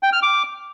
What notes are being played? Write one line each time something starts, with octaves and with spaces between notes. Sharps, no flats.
G5
F6
D6